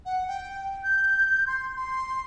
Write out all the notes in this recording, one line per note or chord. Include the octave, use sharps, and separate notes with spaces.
F#5
G5
G6
C6
C6